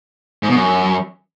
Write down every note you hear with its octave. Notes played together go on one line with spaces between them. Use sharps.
G#2
B2
F#2